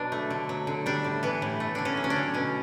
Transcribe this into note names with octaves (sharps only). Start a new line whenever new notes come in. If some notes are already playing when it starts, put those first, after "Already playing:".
Already playing: B2 F#3 D4
A3
D3
F#3
D3
G3 D4
A2
E3 B3
A2
A3
D3 D4
C#4
F#3
C#4
D4
D3
B2 C#4